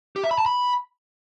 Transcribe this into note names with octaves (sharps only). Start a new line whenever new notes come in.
G4
E5
B5
A5
B5